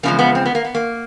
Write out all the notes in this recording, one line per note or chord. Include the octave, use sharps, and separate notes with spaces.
E2 C#3 F3 G#3 A#3
B3
C4
B3
A#3
B3
A#3